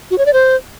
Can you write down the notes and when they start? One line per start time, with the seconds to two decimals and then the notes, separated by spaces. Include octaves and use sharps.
0.11 F#4
0.18 C#5
0.26 D5
0.33 C5